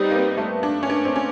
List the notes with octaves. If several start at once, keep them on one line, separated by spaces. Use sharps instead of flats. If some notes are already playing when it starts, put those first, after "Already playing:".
Already playing: G3 B3 C4 D#4
A#3
A3
D4
C#4
D4
C4
C#4